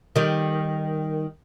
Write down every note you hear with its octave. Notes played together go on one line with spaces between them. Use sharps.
D#3 G3